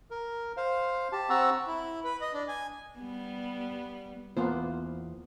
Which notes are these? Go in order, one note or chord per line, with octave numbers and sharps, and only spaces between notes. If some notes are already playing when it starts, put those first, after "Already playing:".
A#4
C5 F5
G4 A5
C4 F#5 A#5 C#6 E6
E4
B4
D#5
D4
G#5
G3 B3
E2 A#3 B3 F4 C5